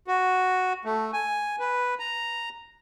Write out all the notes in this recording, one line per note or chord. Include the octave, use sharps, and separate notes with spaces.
F#4
A3
G#5
B4
A#5